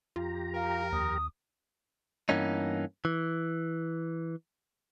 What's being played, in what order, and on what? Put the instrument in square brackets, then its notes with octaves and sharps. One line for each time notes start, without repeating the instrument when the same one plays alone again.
[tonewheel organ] F2 G4 A#5 [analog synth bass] F4
[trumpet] A#4 [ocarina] F5
[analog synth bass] D#2 [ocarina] D#6
[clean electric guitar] G2 E3 A#3 B3 C#4 D#4
E3